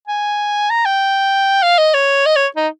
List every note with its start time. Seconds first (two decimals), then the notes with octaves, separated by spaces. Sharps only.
0.07 G#5
0.70 A#5
0.85 G5
1.63 F5
1.78 D#5
1.94 C#5
2.25 D#5
2.36 C#5
2.56 D#4